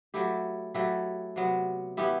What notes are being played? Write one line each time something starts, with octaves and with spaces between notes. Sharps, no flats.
F#3 A3 E4 G4
F#3 A3 E4 G4
C3 F#3 B3
E3 B3 E4 G4